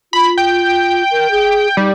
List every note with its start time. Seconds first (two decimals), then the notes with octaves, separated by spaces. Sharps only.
0.13 F4 B5
0.38 G5
1.11 A#4
1.31 G#4
1.77 G3 D#4